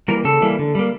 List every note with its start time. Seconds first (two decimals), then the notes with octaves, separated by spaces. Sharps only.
0.08 E3 G3 A#3 A#4
0.25 C#3 A4
0.42 E3 G3 A#3
0.59 D3
0.75 G3 A#3